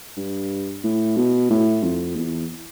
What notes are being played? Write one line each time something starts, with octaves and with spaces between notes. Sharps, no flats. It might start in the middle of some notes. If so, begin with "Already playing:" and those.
G2
A2
B2
A2
F2
E2